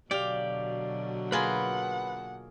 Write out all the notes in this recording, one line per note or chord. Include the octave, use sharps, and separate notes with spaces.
B2 D3 F#3 G4 D5 F5
A#3 F4 G#4 B4 F#5 B5